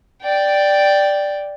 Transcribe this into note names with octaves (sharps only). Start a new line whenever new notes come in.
D5 G5